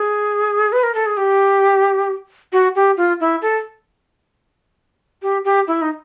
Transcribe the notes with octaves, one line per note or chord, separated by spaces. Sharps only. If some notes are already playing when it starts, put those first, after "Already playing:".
Already playing: G#4
B4
A#4
A4
G#4
G4
F#4
G4
F4
E4
A4
G4
G4
E4
D#4